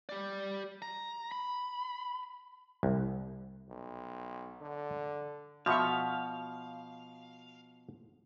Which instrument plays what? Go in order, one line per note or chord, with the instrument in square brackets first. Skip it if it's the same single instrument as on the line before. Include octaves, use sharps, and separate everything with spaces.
[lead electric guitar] G4 D5
A#5
B5
[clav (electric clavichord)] C2
[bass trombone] B1
D3
[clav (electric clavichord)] B2 F3 [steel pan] F#4 E5 C#6 [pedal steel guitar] F5